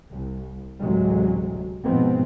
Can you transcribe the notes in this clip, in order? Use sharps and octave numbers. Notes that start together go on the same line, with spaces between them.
C2
A1 D2 C3 F#3 G#3
G#2 B2 F3 G#3 B3 C4